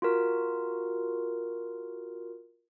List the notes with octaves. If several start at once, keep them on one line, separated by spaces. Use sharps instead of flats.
F4 F#4 A#4